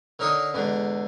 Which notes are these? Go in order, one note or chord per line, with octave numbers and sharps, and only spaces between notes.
D3 D#4 A#4 C#5 D#5 D#6
E2 G#2 D3